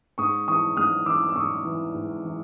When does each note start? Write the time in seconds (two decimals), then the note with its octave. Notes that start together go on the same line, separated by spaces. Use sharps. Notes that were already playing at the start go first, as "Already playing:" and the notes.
0.18 G#2 C#6 D#6
0.48 E3 C#6 D#6
0.77 G#2 D#6 F6
1.06 E3 D6 E6
1.29 E6
1.36 G#2 C#6 D#6
1.65 E3
1.94 G#2
2.24 E3